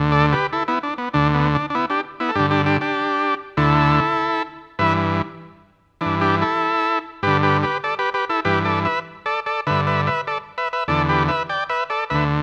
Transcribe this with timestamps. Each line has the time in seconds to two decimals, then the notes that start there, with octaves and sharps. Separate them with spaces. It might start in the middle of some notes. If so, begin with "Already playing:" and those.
Already playing: D2 D3
0.12 A4 D5
0.32 G4 B4
0.53 E4 A4
0.68 B3 E4
0.83 D4
0.98 B3
1.14 D2 D3 D4
1.34 B3
1.55 D4
1.70 D4
1.75 B3 E4
1.90 D4 G4
2.20 B3 E4
2.29 A4
2.35 G2 D3 D4 G4
2.51 D4 G4
2.66 D4 G4
2.81 D4 G4
3.57 D2 D3 E4 A4
4.79 G2 E3 B4 E5
6.01 G2 E3 D4
6.21 D4 G4
6.42 E4 A4
7.23 G2 D3 G4 B4
7.43 G4 B4
7.63 G4 B4
7.84 A4 D5
7.99 G4 B4
8.14 G4 B4
8.30 E4 A4
8.45 G2 E3 G4 B4
8.65 A4 D5
8.85 B4 E5
9.26 A4 D5
9.46 A4 D5
9.67 G2 D3 B4 E5
9.87 B4 E5
10.07 B4 E5
10.27 A4 D5
10.58 B4 E5
10.73 B4 E5
10.88 E2 D3 A4 D5
11.09 G4 B4
11.29 B4 E5
11.49 D5 G5
11.70 B4 E5
11.90 A4 D5
12.10 D2 D3 B4 E5